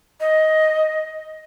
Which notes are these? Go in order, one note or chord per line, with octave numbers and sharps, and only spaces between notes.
D#5